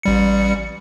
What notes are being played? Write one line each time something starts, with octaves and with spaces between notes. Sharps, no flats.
A1 G3 C#7